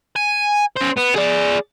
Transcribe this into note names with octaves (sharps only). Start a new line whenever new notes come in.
G#5
C#4 C5
B3
G#4 D5